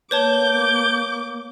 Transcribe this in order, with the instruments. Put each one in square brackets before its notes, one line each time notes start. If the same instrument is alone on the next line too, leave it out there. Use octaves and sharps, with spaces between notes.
[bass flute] A#3 [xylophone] B4 C#5 A5 [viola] D6 [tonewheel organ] G6